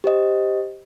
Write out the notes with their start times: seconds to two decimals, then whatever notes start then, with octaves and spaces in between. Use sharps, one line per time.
0.04 G4 C5 D#5